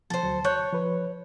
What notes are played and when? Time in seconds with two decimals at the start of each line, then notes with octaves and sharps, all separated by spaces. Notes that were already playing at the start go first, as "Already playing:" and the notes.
0.10 F3 A4 C5
0.23 D2 F#3
0.45 C#5 A5 F#6 G6
0.73 F3 B4